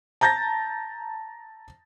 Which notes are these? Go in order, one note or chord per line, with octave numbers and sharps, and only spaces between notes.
A5 A#5 G6 A6 A#6